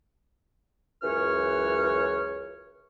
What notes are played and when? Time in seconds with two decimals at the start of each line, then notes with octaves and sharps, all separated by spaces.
1.03 C#2 F#2 E3 B4 C#5 F6